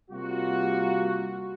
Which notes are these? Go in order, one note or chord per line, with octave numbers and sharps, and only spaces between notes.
C3 G3 A#3 F4 F#4